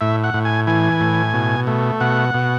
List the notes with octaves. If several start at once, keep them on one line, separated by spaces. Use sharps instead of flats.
A2 E5
F#5
A2
G#5
E3 G#5
A2
B2
A3
B2 F#5
B2